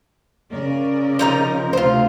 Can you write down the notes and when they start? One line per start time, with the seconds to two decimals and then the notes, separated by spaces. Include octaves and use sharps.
0.52 C#3 A#4 D5
1.19 F3 D#4 A#5
1.73 D2 C3 F4 C5